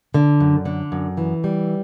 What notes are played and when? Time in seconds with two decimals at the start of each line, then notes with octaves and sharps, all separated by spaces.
0.14 D3
0.40 F#2
0.65 D3
0.92 F#2
1.18 E3
1.44 G3